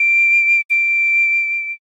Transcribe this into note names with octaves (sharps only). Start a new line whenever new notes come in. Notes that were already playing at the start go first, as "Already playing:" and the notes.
Already playing: D7
D7